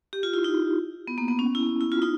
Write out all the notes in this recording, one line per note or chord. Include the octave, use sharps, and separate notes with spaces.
G4
F4
E4
D#4
B3
A#3
B3
C#4
E4
E4
F4
D#4